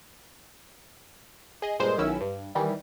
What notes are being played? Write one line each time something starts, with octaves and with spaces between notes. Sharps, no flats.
G#4 D#5
G2 A#2 G#3 C5
B1 D#3 F#3 C#4 E4 E6
G2
D#3 E3 G3